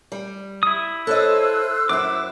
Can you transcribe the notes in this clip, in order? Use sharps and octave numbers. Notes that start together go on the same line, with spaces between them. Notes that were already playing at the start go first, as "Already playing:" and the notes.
G3
E4 D#6
A4 C5 C#5 D#5 E6 F#6
F#2 E4 D6